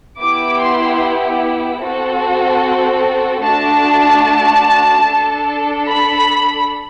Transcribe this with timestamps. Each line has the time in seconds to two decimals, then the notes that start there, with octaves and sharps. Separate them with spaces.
0.19 B3 E4 G4 D6
0.61 C6
1.82 C4 F#4 A4
3.44 A3 D4 F#4 A5
5.06 D4 A4
5.87 B5